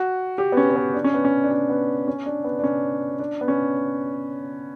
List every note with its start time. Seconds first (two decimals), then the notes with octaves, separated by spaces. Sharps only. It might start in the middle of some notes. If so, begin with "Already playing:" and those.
Already playing: F#4
0.38 G4
0.52 B3
0.57 C#4
0.70 C#4
0.76 B3
0.94 D4
1.04 C#4
1.14 B3
1.25 C#4
1.44 D4
1.51 C#4
1.70 B3
2.08 C#4
2.26 D4
2.44 B3
2.59 D4
2.64 C#4
3.19 D4
3.41 B3
3.48 C#4